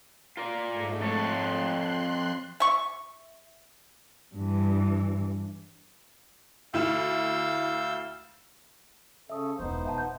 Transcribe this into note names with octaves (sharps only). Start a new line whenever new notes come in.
F4 A#4 D5
G#2 A3
F2 A4 C#5 C6 F#6
E5 C#6
G2 E3
D2 E4 F5 E6 G6 E7
C#3 C#4 A4 E5 D#6
E1 C#2 B3 D#4 C5
B2 E5 F#5 A5
E5 G6